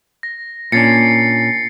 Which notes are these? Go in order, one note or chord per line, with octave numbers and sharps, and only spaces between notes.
A#6
A#2 C#4 D4 A6 C7 C#7